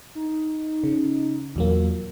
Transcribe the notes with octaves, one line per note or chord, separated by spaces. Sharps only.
D#4
C#3
E2 A#2 F#3 A#3